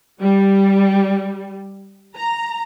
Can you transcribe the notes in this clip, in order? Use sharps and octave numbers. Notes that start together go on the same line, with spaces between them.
G3
A#5